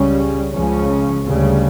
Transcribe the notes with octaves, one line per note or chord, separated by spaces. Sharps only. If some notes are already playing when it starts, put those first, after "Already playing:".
Already playing: C#2 C#3 G3 C#4
C#2 C#3 F3 C#4
D2 C#3 G3